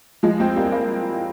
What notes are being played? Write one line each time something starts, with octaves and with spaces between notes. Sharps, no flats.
F3 G#3
G#3 C4
G3 A#3
G3 A#3